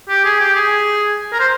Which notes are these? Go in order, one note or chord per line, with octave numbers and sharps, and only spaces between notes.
G4
G#4
G4
G#4
A#4
C5